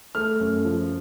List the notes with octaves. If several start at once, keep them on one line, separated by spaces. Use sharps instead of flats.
A3 F6
F#2
F3